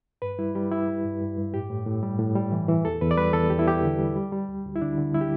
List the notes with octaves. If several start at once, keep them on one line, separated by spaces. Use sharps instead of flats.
G2 B4
G3 E4
G3 G4
G3 E4
G3
G2
G2
G2
A2 G4
A2
A2
G3
A2
G3
E3
E3
E2 A4
E2 B4
D5
G3 B4
E2 A4
E2 G4
E4
E2 G4
D3
G3
G3
G3
D2
D2
E4
D3 D4
D3
G3 E4
G4